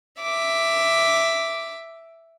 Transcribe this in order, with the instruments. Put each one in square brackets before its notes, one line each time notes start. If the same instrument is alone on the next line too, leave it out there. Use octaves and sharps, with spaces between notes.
[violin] E5 D6